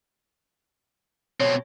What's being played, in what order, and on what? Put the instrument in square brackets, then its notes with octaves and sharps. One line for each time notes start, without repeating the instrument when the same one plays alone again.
[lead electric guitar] B2 C4 [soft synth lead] C#5